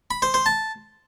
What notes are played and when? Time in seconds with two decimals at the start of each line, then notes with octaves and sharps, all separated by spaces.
0.11 B5
0.22 C5
0.34 C5
0.46 A5